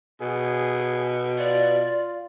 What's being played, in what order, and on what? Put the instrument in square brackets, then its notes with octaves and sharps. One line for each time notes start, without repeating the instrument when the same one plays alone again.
[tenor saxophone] B2 [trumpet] G#4
[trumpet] F4 [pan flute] D5